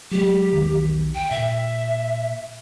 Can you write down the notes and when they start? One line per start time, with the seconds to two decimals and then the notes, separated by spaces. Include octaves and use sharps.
0.11 F#3 G#3 G4
0.53 B1 E2 D#3
1.15 G5
1.31 A#2 E5